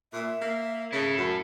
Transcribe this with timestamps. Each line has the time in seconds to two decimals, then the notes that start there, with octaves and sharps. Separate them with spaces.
0.13 A#2 E5
0.42 A#3
0.92 C#3 E4 A4
1.18 F#2